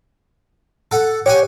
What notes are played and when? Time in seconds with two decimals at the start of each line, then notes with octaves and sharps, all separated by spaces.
0.91 A4 F#5
1.26 G4 C#5 F#5 G#5